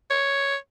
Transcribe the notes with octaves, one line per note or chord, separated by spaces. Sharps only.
C#5